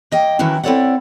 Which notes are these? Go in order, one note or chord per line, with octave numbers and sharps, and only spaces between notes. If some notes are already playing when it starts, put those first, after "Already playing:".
A#3 D#5 G5
D#3 E3 F#3 C#4 E4
C4 E4 A4 C#5 D5 F#5